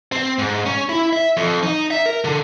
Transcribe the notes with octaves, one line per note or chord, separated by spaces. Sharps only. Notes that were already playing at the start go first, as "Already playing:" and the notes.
C4
G#2
C#4
E4
E5
F2
D#4
E5
A#4
D3